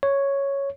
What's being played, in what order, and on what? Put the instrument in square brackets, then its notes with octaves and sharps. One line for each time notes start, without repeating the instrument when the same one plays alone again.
[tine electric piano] C#5